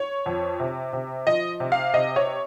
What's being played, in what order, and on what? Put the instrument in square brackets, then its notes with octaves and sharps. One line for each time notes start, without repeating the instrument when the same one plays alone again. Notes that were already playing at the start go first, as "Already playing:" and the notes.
Already playing: [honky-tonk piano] C#5
F2
C3
C3
F3 D#5
C3
F5
C3 D#5
C#5